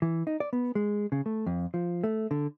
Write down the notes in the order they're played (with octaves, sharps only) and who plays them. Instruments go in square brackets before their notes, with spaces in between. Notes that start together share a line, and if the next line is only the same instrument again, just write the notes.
[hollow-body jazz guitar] E3
D#4
D5
B3
G#3
C#3
A3
F2
F3
A3
D3